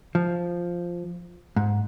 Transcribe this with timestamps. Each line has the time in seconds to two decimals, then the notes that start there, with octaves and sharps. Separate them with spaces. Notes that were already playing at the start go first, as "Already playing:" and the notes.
0.15 F3
1.56 G#2